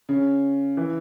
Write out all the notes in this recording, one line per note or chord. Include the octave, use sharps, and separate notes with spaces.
C#3
E3